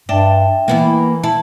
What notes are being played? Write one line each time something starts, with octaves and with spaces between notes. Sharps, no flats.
G2 D4 E5 G5
E3 A#3 B3 E4
E4 A5